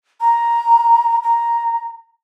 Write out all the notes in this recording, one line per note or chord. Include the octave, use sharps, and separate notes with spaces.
A#5
A#5